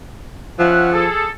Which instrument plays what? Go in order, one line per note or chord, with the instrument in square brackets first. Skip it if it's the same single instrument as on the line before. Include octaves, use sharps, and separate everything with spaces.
[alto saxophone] F3 [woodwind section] C#4 E5 F#5
[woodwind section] G#4 A4